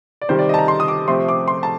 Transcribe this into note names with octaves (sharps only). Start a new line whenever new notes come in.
D5
C3 D#3 G3 C5
D5
D#5 A5
A#5
C6
D#6
D6
C3 F3 A3 C4 C6
D6
C6
A5